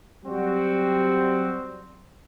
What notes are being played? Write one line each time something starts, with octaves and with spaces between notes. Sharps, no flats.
F#3 G3 C4 F#4